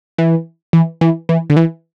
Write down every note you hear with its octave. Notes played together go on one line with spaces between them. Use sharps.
E3
E3
E3
E3
D3
E3